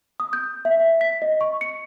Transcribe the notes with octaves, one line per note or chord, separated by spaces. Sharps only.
D#6
G6
E5
E5
B6
D#5
C#6
C#7